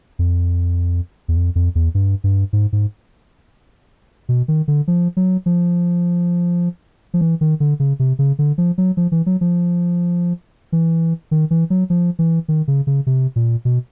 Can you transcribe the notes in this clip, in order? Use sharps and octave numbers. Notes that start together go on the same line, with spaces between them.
F2
E2
F2
F2
E2
G2
G2
G#2
G#2
B2
D#3
D3
F3
F#3
F3
F3
E3
D#3
D3
C#3
C3
C#3
D3
F3
F#3
F3
E3
F#3
F3
E3
D#3
E3
F#3
F3
E3
D#3
C#3
C#3
C3
A#2
B2